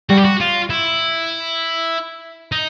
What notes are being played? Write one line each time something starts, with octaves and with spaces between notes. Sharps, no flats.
G3 F#4
G4
F#4
F4
E4
D#4